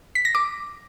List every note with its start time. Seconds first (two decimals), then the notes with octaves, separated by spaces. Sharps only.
0.15 B6
0.25 A#6
0.35 D6